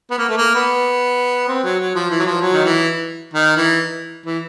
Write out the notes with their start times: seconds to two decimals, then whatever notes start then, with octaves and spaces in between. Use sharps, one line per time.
0.10 B3
0.18 A#3
0.29 A3
0.37 A#3
0.55 B3
1.48 C4
1.64 F#3
1.79 F#3
1.95 F3
2.11 E3
2.19 F#3
2.26 F3
2.42 F#3
2.54 D#3
2.64 E3
3.34 D#3
3.57 E3
4.26 E3